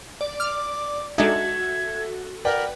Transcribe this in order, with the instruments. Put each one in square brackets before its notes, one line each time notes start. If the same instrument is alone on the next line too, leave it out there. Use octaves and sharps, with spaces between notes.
[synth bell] D5
[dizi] D6 [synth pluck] F6
[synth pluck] G#3 D4 D#4 [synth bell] F#4 A4 [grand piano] E5 [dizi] G#6
[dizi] A#4 [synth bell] B4 F#5 [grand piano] D5 G5